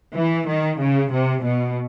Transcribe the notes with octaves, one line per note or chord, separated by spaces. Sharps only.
E3
D#3
C#3
C3
B2